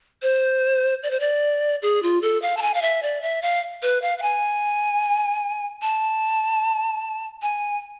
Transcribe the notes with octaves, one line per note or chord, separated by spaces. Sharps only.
C5
D5
C5
D5
G#4
F4
A4
F5
A5
G#5
F5
E5
D5
E5
F5
B4
F5
F5
G#5
A5
G#5